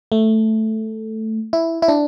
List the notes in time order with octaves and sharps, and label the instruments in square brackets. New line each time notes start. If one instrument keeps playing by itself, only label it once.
[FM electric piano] A3
E4
E4
D4